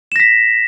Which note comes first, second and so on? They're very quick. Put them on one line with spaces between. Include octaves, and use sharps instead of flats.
E7 A#6 B6